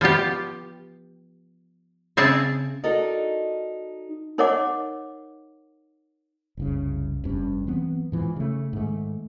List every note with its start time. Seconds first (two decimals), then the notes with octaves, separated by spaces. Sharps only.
0.01 F3 B3 F4 G4
2.17 C#3 C4 G#4 E5 A5
2.84 D#4 F#4 A4 A#4 D5 D#5
4.38 D#4 A#4 C#5 D#5 F#5 D6
6.57 F#1 C2 C#3
7.24 F1 G2 C#4
7.67 E3 F#3 B3 C4
8.12 G#2 E3 F3
8.36 C#3 A3
8.73 G#2 D#3 A3